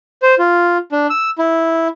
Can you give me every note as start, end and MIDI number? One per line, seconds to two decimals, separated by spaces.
0.22 0.35 72
0.38 0.78 65
0.92 1.07 62
1.10 1.30 88
1.38 1.88 64